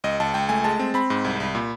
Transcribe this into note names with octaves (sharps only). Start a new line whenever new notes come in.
C#2 D#5
C#2 A5
C#2 G5
A3 G#5
G#3 A5
C4
C4 B5
G#2
C2
C2
A#2